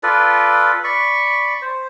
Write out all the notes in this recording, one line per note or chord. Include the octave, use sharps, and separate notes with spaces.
F4 A4 B4 D5
D5 B5 C#6
C5